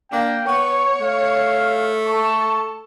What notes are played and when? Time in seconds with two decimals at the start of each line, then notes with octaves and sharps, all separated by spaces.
0.12 A#3 D4 G5
0.48 B3 C#5 C#6
1.00 A3 F5
2.07 A4 A5 C#6